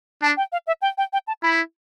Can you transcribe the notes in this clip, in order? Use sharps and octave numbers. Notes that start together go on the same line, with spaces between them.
D4 A5
G5
F5
E5
G5
G5
G5
A5
E4 B5